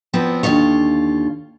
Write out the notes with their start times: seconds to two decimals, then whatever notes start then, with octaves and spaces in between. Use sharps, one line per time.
0.13 E2 F3 B3 C4
0.43 D#2 B2 D3 F4 C#5